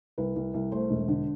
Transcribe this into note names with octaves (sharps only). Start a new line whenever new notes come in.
C2 B4
C2
C2
A3 C5
E1
D3